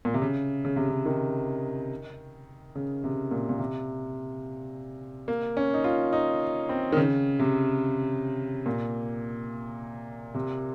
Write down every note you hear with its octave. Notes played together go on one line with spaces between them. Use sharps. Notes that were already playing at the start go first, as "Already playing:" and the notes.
A#2
C3
C#3
C#3
C3
C#3
D#3
C#3
C3
A#2
A#2
C3
A#3
C#4
D#4
F4
D#4
C4
D#3
C#3
C3
A#2
C3